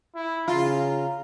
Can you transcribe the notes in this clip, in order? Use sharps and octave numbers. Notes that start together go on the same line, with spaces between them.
E4
C#3 F4 A#5